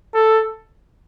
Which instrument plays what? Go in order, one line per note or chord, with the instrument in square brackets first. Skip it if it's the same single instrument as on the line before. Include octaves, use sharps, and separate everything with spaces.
[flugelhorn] A4